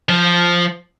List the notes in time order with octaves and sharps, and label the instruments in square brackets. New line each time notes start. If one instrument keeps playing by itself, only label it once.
[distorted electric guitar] F3